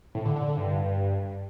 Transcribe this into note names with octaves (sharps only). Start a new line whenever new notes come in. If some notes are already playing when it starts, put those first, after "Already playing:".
A2
D3
D3
D3
G2